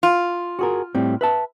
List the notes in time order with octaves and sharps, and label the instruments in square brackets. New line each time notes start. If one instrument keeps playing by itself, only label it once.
[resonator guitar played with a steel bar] F4
[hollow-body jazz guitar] F#4 G#4 A#4
A2 G3 C4
B4 E5 A5